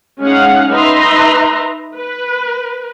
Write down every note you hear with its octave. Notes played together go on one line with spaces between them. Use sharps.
G#3 C#4 D#4 F5 F#5
D#4 B4 E5 A#5 C6
B4